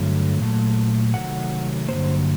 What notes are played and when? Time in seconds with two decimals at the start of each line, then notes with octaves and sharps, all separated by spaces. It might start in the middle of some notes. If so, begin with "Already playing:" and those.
Already playing: G2 D3 F#3 A3
0.41 A#2 F#3 A3
1.14 C3 D#3 F#3 A3 F#5
1.88 G2 D3 F#3 A#3 C5